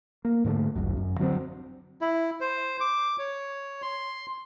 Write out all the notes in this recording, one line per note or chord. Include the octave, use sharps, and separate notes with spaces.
A#3
G#2 D3 G#3 A3
G#1 C#2 F#2
F#2
D3 F#3 B3 C4
E4
C5
D6
C#5
C6